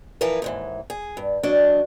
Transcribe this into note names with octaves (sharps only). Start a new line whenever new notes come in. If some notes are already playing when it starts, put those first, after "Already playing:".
E3 F3 E4 A#4 B4
D#2 G#2 E3
G#4
G2
F#3 D4 D#5